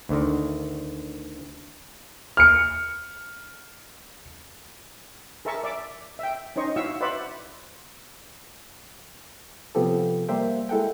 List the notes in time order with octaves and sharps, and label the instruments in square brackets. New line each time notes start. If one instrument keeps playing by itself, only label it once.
[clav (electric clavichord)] D2 D3 D#3
[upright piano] F6 C#7
[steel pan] G#4 A#4 E5 A5 C#6
D5 E5 D6
E5 G5
C#4 D#4 C5 D#5 C#6
E4 F#4 E5 F5 C#6 E6
B4 C5 D5 E5 F#5 B5
[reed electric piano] C3 F3 B3 G4 A4
G3 A#3 G4 C5 E5 G5
G#3 E4 A4 F#5 G5